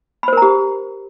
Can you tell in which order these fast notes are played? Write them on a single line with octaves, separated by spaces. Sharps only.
B5 C5 A#4 A#5 G4